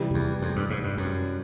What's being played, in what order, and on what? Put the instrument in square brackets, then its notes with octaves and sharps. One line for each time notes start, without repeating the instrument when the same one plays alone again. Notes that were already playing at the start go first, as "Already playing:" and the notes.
Already playing: [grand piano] C3 E3 G3
[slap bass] F2
E2
F2
G2
G#2
G2
F#2